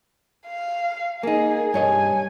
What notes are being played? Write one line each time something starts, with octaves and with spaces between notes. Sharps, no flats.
F5
A#3 D#4 G#4
G2 C#5 D#5 G#5